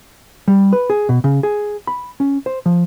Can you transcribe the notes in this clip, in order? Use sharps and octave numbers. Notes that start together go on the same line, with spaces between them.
G3
B4
G#4
B2
C#3
G#4
B5
C#4
C5
F3